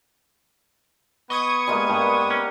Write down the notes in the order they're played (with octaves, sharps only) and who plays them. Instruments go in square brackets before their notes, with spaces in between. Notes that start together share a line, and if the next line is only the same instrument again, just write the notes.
[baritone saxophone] B3 [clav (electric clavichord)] D#5 [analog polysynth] C#6 D#6 G#6
[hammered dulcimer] G3 G#3 A#3
[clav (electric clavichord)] G2
C#4